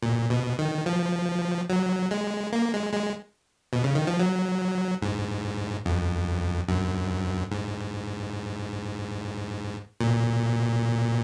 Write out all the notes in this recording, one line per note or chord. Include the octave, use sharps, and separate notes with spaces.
A#2
B2
D#3
F3
F#3
G#3
A#3
G#3
G#3
B2
C#3
D#3
F3
F#3
G#2
F2
F#2
G#2
A#2